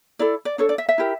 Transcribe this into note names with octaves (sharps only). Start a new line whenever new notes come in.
E4 A4 D5
D5
D4 A4 C#5
D5
E5
E5
E4 G4 A#4